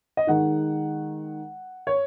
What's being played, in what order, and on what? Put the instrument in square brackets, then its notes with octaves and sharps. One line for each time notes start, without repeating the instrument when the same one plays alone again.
[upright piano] D#5
D#3 G#3 D#4 F#5
C#5